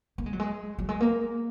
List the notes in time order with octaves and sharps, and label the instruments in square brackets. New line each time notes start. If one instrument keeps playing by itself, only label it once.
[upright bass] A#3
G#3
F#3
G#3
F#3
G#3
A#3